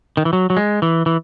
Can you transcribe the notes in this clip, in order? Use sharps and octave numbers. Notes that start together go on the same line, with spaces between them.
D#3
E3
F#3
F#3
G#3
E3
E3